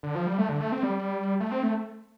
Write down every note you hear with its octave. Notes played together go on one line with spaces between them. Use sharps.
D3
F3
G3
A3
D3
A3
C4
G3
A3
C4
A3